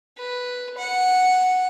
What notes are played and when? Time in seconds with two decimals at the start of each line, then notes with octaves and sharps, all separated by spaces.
0.18 B4
0.78 F#5